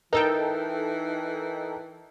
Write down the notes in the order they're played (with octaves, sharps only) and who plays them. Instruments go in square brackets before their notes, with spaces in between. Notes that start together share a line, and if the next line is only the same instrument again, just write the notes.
[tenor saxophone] E3 [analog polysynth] D#4 A4 G5 [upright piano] A#4